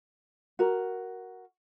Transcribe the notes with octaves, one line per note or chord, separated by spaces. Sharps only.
F#4 A#4